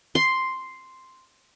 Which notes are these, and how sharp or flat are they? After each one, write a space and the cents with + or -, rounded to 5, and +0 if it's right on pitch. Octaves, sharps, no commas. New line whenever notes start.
C6 +0